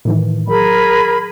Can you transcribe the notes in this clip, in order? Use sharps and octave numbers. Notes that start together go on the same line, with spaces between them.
A2 D#3 E3
F#3 G#4 A#4 B5